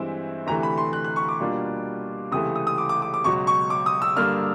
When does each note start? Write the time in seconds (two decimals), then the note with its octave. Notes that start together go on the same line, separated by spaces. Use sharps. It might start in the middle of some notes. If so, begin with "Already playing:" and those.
Already playing: G2 E3 G#3 C4 E4
0.47 D2 C3 E3 A3 A#5
0.63 B5
0.77 C6
0.93 F#6
1.04 F#6
1.16 C#6
1.28 D6
1.40 B2 G3 A#3 D4 F4
2.32 C#2 C3 E3 A3 D#6
2.56 D#6
2.67 D#6
2.78 D6
2.89 D6
3.02 D6
3.14 D6
3.24 C#2 B2 F#3 C#6
3.47 C#6
3.70 D6
3.86 D#6
4.02 E6
4.16 G2 D3 G3 A#3 D4 F6